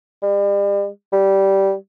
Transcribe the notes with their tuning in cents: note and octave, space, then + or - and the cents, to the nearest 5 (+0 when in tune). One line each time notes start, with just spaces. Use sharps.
G3 +40
G3 -10